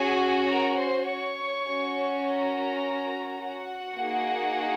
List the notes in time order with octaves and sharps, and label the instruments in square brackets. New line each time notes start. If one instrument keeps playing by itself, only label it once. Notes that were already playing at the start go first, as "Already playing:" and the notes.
Already playing: [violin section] C#4 F#4 G#4 G#5
A#4 A#5
C5 C6
C#5 C#6
C#4 F#4
A#4 A#5
F#4 F#5
A#3 D#4 G#4